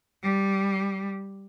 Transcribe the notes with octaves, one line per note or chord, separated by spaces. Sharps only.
G3